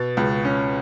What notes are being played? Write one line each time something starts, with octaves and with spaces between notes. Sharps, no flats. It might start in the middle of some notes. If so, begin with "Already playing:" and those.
Already playing: B2 A6
C#2
C#4